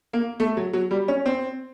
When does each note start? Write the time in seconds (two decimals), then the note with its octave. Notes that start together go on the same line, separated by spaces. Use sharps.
0.13 A#3
0.40 A3
0.57 F#3
0.73 F#3
0.91 G3
1.08 C#4
1.26 C4